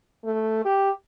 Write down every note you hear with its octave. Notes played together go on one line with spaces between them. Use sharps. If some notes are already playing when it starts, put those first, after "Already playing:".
A3
G4